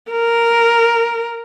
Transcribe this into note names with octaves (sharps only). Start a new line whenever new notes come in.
A#4